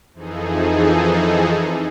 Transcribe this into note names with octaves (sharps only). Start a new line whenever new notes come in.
F2 E3 F3 D#4 G#4 A4